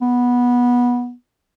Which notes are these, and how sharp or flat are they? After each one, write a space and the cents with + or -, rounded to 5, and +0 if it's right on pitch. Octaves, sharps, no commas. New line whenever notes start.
B3 -15